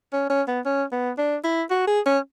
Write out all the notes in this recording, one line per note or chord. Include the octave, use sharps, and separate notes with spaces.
C#4
C#4
B3
C#4
B3
D4
E4
F#4
G#4
C#4